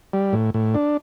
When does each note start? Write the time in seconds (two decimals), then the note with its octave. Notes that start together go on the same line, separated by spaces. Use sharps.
0.13 G3
0.33 A2
0.54 A2
0.75 D4